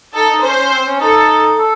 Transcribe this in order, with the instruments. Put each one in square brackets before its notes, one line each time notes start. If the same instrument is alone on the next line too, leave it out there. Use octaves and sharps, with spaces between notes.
[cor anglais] D#4 [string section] A4
[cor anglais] D#4
[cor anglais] C#4 [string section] C5
[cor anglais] C#4
C4
C#4
[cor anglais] D#4 [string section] A4
[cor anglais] A4